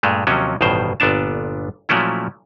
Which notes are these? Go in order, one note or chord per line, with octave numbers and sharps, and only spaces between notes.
G2 A#2 G#3 A3
D#2 C3 F3 F#3 C#4
A1 G2 B2 D#3 C5
G1 A#2 B3 D4 A5
A#2 F3 F#3 A3 C#4 E4